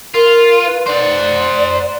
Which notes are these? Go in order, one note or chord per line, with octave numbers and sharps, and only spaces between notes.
F4 A#4
B4
C5 D5 F#5